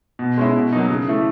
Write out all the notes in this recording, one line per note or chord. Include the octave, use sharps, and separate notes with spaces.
B2
G#3 C#4 E4
B2
F#3 A#3 D#4
C#3
E3 A3